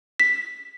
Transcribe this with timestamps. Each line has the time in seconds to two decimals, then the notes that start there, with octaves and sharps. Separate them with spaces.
0.20 B6